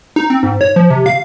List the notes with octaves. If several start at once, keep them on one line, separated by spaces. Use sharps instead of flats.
D#4
C4
G#2
C#5
F3
C3
F5